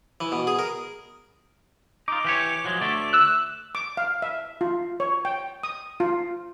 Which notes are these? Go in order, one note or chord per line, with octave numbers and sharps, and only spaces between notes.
E3
B2
G#4
A#4
D#4 F4 D6
E3 G4 C#5
F3 F#3 G#3
D2 A3 D5
E6 F#6
D6
F5
E5
F4
C#5
G5
D#6
F4